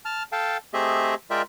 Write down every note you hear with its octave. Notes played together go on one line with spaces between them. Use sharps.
A5 F6
A4 F5 G5 A5
A3 C4 G4 G#4 D#5 E5
G#3 F4 A#4 D5 E5 G5